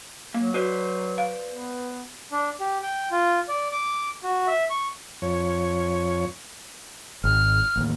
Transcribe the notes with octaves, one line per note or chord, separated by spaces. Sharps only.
F#3 A#3
F#4 B4 C5 D5
F5
B3
D4
G4
G5
F4
D5
D6
F#4
E5
C#6
F2 C#5
G#1 F6
A1 D#2